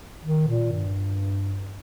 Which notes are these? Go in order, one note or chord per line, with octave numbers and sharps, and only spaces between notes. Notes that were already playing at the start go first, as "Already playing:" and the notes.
D#3
A#2
G2